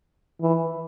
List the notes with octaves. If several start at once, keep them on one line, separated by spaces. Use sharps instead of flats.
E3